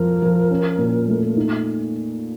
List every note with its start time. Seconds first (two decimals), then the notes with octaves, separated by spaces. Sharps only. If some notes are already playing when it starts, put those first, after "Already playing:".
Already playing: F2 F3 A#4
0.22 F3
0.50 C#4
0.79 A#2
1.08 A3
1.37 D#4